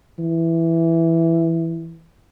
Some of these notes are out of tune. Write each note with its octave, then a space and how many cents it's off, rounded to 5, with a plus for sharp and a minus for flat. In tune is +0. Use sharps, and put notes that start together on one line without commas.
E3 +5